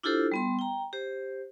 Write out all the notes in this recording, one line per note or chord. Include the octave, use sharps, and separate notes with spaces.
D4 E4 F4 G4 A4 C5
G3 B3 C6
G5 A#5
G4 C5